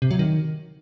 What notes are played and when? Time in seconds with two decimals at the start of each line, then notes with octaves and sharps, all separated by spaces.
0.02 C3
0.11 F#3
0.19 D#3